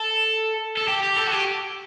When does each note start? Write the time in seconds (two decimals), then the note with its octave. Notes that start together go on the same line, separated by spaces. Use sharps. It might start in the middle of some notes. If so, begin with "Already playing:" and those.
Already playing: A4
0.77 A4
0.88 G4
1.03 G4
1.16 A4
1.27 F#4
1.32 G4